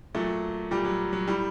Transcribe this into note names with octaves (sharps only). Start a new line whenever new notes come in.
A#2 F#3 A3
A#2 G3
F#3
F#3
A2 G3